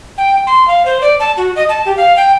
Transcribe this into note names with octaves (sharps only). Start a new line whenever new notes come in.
G5
C6
F5
C5
D5
A5
F#4
D#5
A5
G4
F5
G5